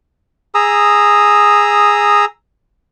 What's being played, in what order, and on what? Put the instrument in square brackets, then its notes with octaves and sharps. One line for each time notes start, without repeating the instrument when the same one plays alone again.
[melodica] G#4 A#5 D#6 E6